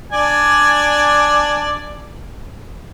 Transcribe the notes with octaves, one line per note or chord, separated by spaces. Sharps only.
D4 D5 G#5